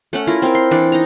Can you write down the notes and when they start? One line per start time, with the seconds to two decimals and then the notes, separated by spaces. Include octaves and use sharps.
0.13 A3 C#4 F#5
0.27 E4 F4 A#4
0.42 C4 A#4
0.55 C6
0.71 E3 D4
0.92 D#4 A#5